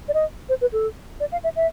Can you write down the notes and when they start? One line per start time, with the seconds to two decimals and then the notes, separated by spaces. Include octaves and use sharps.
0.09 D5
0.14 D#5
0.49 C5
0.61 B4
0.73 A4
1.20 D5
1.32 F5
1.44 E5
1.56 E5